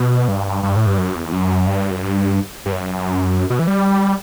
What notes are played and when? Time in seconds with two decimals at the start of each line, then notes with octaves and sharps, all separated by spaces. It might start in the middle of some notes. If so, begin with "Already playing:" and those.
Already playing: B2
0.28 G2
0.63 G2
0.76 A2
0.86 G2
0.98 F#2
1.15 E2
1.33 F#2
1.67 G2
1.91 F#2
2.03 G2
2.66 G2
2.72 F#2
3.50 B2
3.59 E3
3.67 G3